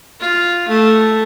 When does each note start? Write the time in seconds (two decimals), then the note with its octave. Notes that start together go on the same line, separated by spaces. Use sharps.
0.21 F4
0.68 A3